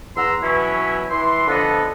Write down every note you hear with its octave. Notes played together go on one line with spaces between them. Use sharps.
E2 F#5 A#5 C6 E6
B2 E3 F#3 C#4 E4
E3 C6
D3 F3 B3 A4 B4 D#5